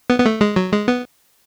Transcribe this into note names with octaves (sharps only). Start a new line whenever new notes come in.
B3
B3
A3
G#3
F#3
G#3
B3